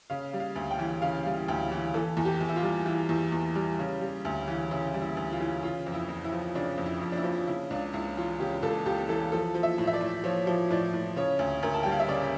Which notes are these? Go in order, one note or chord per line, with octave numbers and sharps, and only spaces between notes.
C#3 F5
G3
F5
D2
G5
E3
C#3 F5
G3
D2 G5
E3
E3 A4
E2
G4
E2
E4
F4
G3
E3
E2
E2
G3
C#3
G3
D2
E3
C#3 E4
G3
E4
D2
F4
E3
C#3 F4
F2
E4
F2
E4
F3
C#3 D4
F2
E4
F2
D4
E4
F3
C#3 E4
C#2 D4
C#2 E4
E3 F4
C#3 G4
C#2 A4
C#2 G4
E3 A4
F3 A4
F3
E5
A2
E5
D5
A2
F3 C#5
F3
A2 D5
A2
C#3 C#5
D2
D2 A#4
A5
G3 G5
F5
E5
C#3 D5